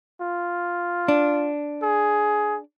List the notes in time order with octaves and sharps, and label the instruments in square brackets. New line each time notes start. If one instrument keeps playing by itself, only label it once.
[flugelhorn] F4
[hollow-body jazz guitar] D4
[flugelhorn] G#4